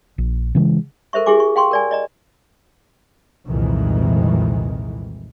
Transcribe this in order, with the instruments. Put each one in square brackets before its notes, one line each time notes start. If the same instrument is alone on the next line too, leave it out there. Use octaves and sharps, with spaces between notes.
[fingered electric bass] A#1
C#3 E3 F#3 G#3
[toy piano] A4 A#4 C5 E5 C#6
E4 G4 G#4 G#5 D6
C#6
F5 G5 C6 C#6
A#4 D5 G#5
D5 D#5 A#5
[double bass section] C2 F2 A#2 D#3 E3 G#3